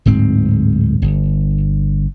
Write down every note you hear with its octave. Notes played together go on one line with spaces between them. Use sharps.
D1 G#2 C4
G1